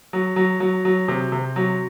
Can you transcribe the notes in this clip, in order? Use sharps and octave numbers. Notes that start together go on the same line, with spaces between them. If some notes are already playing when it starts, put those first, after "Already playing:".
F#3
F#3
F#3
F#3
C3
C3
F#3